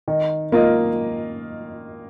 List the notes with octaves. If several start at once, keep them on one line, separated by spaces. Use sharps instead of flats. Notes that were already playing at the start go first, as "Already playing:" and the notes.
D#3
A#3 F4 D#5